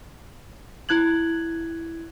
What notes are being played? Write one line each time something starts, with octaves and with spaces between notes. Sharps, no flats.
E4 F#6 G#6 F#7